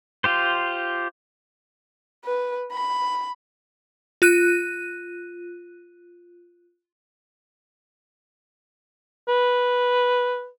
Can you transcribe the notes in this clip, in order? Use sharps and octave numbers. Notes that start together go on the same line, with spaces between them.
F4 G4 C5
B4
B5
F4 F#6 D#7
B4